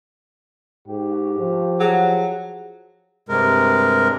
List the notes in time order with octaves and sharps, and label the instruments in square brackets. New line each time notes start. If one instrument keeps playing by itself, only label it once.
[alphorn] G#2 [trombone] G4
[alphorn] F3
[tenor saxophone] F#3 [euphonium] G#4
[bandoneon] G2 C3 G#3 A#4